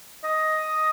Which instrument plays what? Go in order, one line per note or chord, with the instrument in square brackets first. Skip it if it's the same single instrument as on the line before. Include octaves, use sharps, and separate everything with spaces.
[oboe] D#5